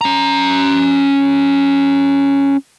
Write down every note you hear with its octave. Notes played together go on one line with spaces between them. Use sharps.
C#4 A#5